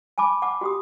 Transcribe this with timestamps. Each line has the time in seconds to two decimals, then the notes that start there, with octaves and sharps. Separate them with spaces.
0.18 G#5 A5 B5 D6
0.42 F#5 A5 D6
0.61 F#4 G4 D#6